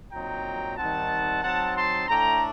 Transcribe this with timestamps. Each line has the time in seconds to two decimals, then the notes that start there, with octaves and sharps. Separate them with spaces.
0.12 A#2 F#3 C4 D#4 G5 A#5
0.77 D#3 G3 C4 D#4 F#5 A5
1.43 F#3 C4 D#4 F#5 A5
1.75 A5 C6
2.08 A2 A3 D4 G5 A#5